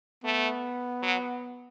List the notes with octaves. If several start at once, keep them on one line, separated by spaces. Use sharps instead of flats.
A3 B3
F#3